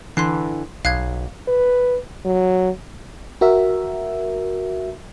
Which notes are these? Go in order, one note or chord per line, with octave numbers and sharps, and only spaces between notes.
D3 E3 C6 F#6 C7
B1 F5 F#6 G#6
B4
F#3
F#4 A#4 E5